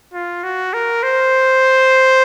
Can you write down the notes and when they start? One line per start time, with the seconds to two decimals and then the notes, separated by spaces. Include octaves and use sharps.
0.13 F4
0.44 F#4
0.74 A#4
1.03 C5